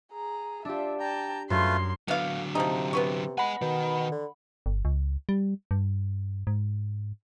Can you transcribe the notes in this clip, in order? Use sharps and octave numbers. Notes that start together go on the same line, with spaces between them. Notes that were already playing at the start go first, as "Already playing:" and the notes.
G#4 A#5
D4 F4 G4 E5
G5 A5 A#5
F#2 A3 F4 B4 C6
D3 F#3 B3 F5
C3 F3 D#4
B3 B4 C#6
D#5 F#5 G#5 B5
B2 D#3
D3
G1
C#2
G3
G2
G#2